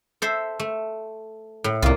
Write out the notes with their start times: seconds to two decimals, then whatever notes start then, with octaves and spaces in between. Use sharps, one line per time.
0.22 A4 C5 E5
0.59 A3
1.64 A2
1.82 C2 A#3 F4